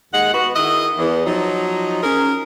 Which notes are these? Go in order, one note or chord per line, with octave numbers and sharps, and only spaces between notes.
D#2 G#3 F#5
B3 F#4
D#3 E4 G#4 D#5
E2
F3 F#3 D#4
C#4 G#4 A#4